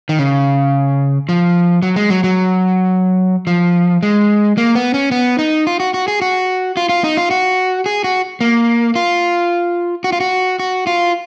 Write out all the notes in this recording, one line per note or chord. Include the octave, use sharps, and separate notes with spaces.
D#3
C#3
F3
F#3
G#3
F#3
F#3
F3
G#3
A#3
B3
C#4
B3
D#4
F4
F#4
F#4
G#4
F#4
F4
F4
D#4
F4
F#4
G#4
F#4
A#3
F4
F#4
F4
F#4
F#4
F4